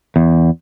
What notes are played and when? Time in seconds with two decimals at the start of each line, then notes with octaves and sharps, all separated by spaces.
0.16 E2